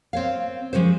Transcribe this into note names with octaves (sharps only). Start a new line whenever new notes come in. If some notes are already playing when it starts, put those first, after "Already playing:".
C4 C#5 F5
F3 G#3 C#4 G4 C5